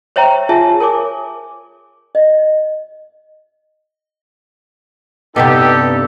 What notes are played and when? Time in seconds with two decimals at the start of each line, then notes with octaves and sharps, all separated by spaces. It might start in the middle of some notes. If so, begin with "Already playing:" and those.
0.16 C5 C#5 E5 G5 A#5
0.49 F4 G#4 C#5 E5 G#5 A5
0.80 A#4 C#5 G#5 D6
2.15 D#5
5.36 G2 C3 B3 D#4 G4 A4